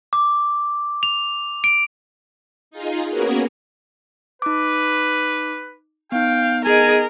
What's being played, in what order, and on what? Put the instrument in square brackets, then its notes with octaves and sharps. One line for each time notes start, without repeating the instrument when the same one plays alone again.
[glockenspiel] D6
F7
D7
[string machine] D#4 F4 G#4
A#3 B3 C#4 F#4 G#4 A#4
[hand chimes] D#4 D6 [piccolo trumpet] B4
[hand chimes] B3 D#4 [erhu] F5 [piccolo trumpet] G5
[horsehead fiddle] G#4 D#5 [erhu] A#4 [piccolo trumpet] G#5